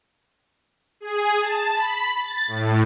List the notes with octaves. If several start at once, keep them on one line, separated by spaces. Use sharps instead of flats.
G#4
A5
B5
A6
A2